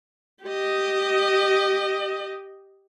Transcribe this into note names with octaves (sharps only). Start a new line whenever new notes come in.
G4 D#5